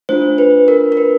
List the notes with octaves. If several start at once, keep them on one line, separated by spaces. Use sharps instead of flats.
A3 D4 F4 C5
B4
A#4
A#4
B4